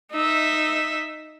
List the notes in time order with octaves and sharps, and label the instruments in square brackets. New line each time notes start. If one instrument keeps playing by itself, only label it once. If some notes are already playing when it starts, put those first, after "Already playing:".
[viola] D#4 E5